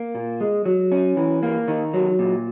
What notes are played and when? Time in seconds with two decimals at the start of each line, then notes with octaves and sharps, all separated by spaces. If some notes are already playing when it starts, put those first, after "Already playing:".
Already playing: A#3
0.15 A#2
0.41 G#3
0.65 F#3
0.92 C#4
1.17 E3
1.43 A#3
1.68 D#3
1.93 F#3
2.19 A#2